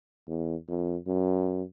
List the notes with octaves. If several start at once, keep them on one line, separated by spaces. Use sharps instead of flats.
E2
F2
F#2